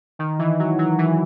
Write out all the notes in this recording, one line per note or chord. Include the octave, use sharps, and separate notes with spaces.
D#3
E3
F#3
F#3
E3